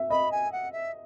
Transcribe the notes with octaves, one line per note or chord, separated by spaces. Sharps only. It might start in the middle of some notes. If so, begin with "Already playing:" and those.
Already playing: E5
D#5 B5
G#5
F#5
E5